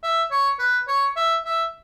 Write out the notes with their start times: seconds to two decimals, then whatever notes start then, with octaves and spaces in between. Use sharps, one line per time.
0.03 E5
0.31 C#5
0.59 B4
0.88 C#5
1.16 E5
1.44 E5